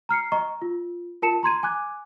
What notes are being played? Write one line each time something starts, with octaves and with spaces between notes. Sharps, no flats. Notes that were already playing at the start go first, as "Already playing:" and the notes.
A#5 F6 C7 C#7
D#5 A#5 C#6
F4
F4 A#4 A5 C#7 E7
A#5 C6 G#6 D#7
G#5 D6 F#6 G#6